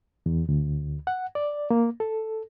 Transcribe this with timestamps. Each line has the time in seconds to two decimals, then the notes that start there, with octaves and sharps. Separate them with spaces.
0.26 E2
0.49 D2
1.07 F#5
1.35 D5
1.70 A#3
2.00 A4